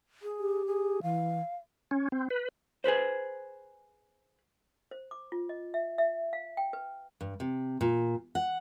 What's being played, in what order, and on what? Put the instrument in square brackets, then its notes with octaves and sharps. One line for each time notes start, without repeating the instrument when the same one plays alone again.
[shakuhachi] G#4
[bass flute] G4
[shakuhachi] G#4
[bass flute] E3 [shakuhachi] F5
[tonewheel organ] C#4
C4
B4
[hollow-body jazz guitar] G#4 A4 B4 C5
[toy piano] C5
D6
F4
D#5
E5
E5
F5
G5
B4
[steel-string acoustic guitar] G2
C3
A#2
F#5